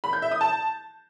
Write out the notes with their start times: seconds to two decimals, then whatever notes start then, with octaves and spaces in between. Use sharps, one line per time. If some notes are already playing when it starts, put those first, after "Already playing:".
0.04 B5
0.13 G6
0.22 E5
0.31 D#6
0.41 A5